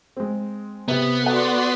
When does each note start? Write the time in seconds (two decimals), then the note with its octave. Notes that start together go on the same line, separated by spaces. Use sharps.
0.17 G#3 C4
0.88 C3 B3 G4
1.24 F#4 A4 D5 F#5 C6